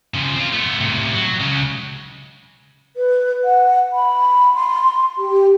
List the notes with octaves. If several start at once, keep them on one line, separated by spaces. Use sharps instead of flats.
C#3 F3
C4 F4
A3 B3
A2 C3
F#3
C#3 G#3
B4
F#5
B5
C6
G4